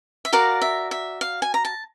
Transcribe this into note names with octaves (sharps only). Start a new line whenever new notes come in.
E5
F#4 A#4 D5 F5
E5
E5
F5
G#5
A#5
A5